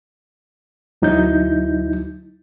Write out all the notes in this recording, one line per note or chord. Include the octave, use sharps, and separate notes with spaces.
D2 F#3 D#4 E4 G6